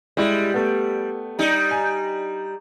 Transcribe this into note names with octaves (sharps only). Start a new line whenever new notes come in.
G3 G#3 E4
A3 B3
G3 D#4
G#5